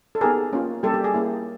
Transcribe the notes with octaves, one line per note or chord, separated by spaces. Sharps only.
A4
B3 D#4 G4 G#4 A#4
A#3 C#4 F4
G3 A#3 C#4 G4 A4
G4
G#4
A#3 C#4 E4